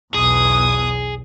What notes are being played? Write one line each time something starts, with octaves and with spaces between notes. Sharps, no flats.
B1 E2 G#4 D#6